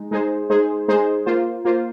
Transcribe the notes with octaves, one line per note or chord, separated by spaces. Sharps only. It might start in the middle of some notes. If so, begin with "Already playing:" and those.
Already playing: G#3 D#4
G#3 D#4 G#4 C5
G#3 D#4 G#4 C5
G#3 D#4 G#4 C5
A#3 F4 C5
A#3 F4 C5